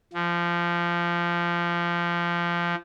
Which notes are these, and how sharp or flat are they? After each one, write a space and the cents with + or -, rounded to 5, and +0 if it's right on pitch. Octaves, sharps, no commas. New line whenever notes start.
F3 -20